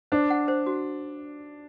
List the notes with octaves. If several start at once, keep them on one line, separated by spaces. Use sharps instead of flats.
D4 C5
F#5
C5
F#4